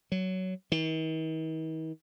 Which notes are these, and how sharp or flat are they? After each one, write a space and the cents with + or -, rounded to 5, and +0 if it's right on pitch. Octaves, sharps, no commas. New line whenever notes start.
F#3 +15
D#3 +45